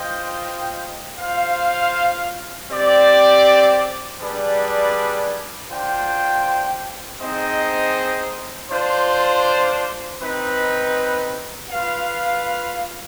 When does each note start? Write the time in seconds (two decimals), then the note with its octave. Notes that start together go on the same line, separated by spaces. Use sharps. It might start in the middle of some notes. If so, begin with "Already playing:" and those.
Already playing: F4 C5 D#5 G5
1.19 F4 C5 F5
2.69 C4 G4 D5
4.20 G3 D4 G#4 B4 D5
5.69 D4 F4 C5 G5
7.20 C4 D#4 G#4 C5 D#5
8.70 D4 F4 C5
10.21 C4 D#4 B4
11.71 F4 B4 F5